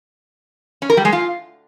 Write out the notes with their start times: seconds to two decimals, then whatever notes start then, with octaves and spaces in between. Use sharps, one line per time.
0.82 C#4
0.90 A#4
0.97 G3
1.05 G#3
1.13 F4